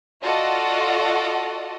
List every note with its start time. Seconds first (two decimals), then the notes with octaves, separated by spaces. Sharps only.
0.22 F4 F#4 A4 D5 D#5 F#5